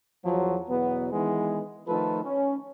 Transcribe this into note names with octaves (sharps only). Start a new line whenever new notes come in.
E2 F3 F#3
E2 B2 F#3 B3
D#3 E3 G#3 B3
D#3 F3 A3 F4 A4 B4
C#4